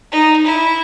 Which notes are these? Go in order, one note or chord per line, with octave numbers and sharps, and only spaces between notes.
D#4
E4